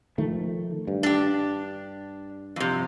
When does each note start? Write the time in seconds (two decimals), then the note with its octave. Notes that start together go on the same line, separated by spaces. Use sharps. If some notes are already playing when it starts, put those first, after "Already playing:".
0.18 D#3 F3 A3
0.87 G2
1.03 D4 G4
2.56 F2 C3